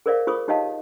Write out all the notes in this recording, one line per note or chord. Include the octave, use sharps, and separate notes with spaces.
G#4 A#4 C5 D5 E5 F5
F4 G#4 C5 C#6 D#6
D#4 G4 C#5 D#5 F5 A5